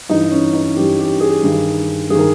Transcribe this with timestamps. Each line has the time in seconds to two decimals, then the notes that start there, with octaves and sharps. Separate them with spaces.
0.09 G2 E3 D#4
0.32 C#4
0.53 D#4
0.76 G2 E3 G4
0.99 G4
1.20 G#4
1.43 G2 D#3
2.09 G2 G#4
2.15 D#3 A#4